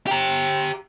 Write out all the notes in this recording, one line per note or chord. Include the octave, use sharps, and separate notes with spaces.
G4 A#5